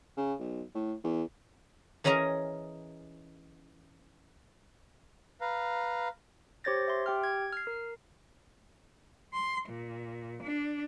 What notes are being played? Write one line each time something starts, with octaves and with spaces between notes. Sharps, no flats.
C#3
B1
A2
E2
E3 C#4 G#4 A#4 D#5 A#5
B4 F5 A#5
G4 C5 C#5 G6 A6 A#6
E5 C6
G4 G5 F6
G#6
F6 C7
A#4
C6
A#2
D4